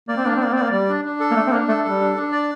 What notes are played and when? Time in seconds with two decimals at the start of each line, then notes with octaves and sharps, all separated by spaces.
0.09 A#3 D5
0.17 C4
0.25 A#3 D4
0.36 C4
0.40 A#3 D5
0.53 C4 D5
0.62 A#3
0.72 G3 D5
0.89 D4
1.05 D4
1.20 A4
1.31 A#3
1.36 A3 D4
1.47 C4
1.53 A#3 D4
1.68 A3 A4
1.84 G3 A4
2.00 D4
2.16 D4
2.32 D5